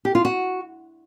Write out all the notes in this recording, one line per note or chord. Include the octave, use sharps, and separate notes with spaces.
G4
F4
F#4